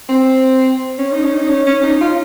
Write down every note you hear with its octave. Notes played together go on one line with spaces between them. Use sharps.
C4
C#4
D#4
C#4
D#4
C#4
C#4
D#4
F4